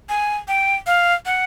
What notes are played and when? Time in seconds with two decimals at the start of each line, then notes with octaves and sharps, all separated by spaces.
0.09 G#5
0.48 G5
0.87 F5
1.26 F#5